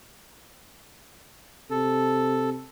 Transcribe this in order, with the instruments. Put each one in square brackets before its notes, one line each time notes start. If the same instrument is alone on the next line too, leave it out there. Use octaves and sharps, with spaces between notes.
[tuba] C3 [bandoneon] A4